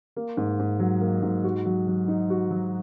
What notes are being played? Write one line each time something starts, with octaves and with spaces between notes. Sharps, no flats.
A#3
G#2
G#2
F#3
A#3
G#2
F#4
F#3
F#3
D#4
F#4
F#3